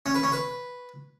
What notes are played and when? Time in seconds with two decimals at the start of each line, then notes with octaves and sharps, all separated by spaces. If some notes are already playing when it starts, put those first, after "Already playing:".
0.06 C#4
0.15 B4
0.23 C#4
0.32 B4